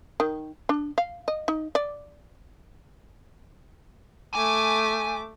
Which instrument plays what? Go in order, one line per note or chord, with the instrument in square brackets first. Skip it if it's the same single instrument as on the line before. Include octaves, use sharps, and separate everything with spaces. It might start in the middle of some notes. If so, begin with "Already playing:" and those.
[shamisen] D#3
D4
F5
D#5
D#4
D5
[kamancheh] A3 D6 [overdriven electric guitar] G#5